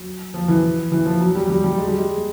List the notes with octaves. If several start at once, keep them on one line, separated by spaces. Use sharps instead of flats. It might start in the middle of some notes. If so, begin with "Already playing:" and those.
Already playing: F#3
F3
E3
E3
F3
F#3
G3
G3
G3
G#3
G3
G#3